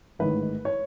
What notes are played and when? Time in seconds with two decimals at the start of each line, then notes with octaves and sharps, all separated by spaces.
0.19 A1 G#2 D#3 B4
0.65 C#5